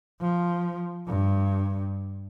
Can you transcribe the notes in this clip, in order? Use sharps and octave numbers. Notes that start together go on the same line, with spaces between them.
F3
G2